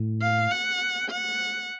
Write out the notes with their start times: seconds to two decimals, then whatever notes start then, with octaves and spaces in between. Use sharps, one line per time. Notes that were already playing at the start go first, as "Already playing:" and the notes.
Already playing: A2
0.22 F5
0.51 F#5
1.10 F#5